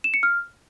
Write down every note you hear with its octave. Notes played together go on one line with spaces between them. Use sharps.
E7
C#7
F6